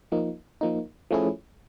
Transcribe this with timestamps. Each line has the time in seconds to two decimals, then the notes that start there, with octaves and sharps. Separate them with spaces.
0.12 F3 A#3 D#4
0.61 F3 A#3 D#4
1.11 F3 A3 C#4 E4 G#4